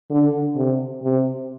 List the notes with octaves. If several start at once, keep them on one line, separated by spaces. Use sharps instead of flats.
D3
C3
C3